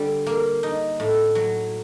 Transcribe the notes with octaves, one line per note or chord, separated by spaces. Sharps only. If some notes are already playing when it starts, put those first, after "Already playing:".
Already playing: D3 G3
A#3
D#4
A2
F#3